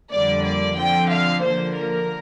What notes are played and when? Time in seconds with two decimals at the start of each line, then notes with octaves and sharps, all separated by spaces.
0.11 F2 D3 G3 A#3 D5
0.43 D5
0.76 D3 F3 C4 G5
1.09 F5
1.42 D3 F3 A#3 C5
1.75 A#4